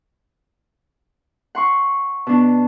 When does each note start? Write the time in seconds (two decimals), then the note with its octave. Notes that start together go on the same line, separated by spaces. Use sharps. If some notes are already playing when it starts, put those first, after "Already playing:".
1.55 F#5 C6 C#6
2.27 B2 D4